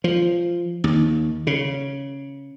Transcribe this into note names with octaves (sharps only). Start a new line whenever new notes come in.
F3
D#2
C#3